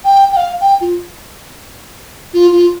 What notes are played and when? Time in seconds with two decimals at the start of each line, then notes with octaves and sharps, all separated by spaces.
0.05 G5
0.32 G5
0.37 F5
0.61 G5
0.81 F4
2.34 F4
2.52 F4